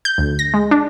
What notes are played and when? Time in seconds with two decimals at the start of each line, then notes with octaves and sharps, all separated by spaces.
0.05 G6
0.18 D2
0.39 A#6
0.54 G#3
0.71 D4